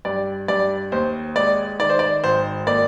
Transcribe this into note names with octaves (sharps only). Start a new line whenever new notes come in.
G2 D5
G2 D5
D#2 C5
G#3 D5
D#3 D5
C5
D5
G#1 C5
A#3 D5